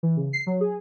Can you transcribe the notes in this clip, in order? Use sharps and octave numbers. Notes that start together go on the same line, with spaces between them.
E3
C#3
C7
F#3
G#4